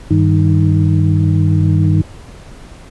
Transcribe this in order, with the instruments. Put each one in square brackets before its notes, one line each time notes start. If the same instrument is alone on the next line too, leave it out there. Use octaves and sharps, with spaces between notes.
[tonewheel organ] G2 D#3